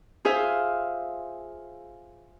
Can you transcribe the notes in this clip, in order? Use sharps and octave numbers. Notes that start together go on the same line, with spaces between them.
F4 G#4 C5 E5 F5